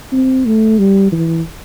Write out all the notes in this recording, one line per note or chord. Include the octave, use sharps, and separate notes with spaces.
C4
A3
G3
E3